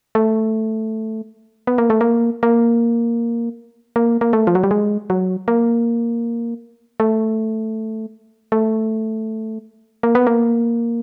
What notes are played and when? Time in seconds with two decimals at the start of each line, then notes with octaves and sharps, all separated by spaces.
0.15 A3
1.67 B3
1.78 A#3
1.90 A3
2.01 A#3
2.43 A#3
3.96 A#3
4.21 A#3
4.33 A3
4.47 F3
4.55 F#3
4.64 G3
4.71 G#3
5.10 F#3
5.48 A#3
7.00 A3
8.52 A3
10.03 A#3
10.15 B3
10.27 A#3